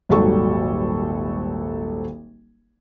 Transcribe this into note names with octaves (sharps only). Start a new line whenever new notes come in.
D#1 G#1 F#3 G3 A4 C#6